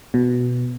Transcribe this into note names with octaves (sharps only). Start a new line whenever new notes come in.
B2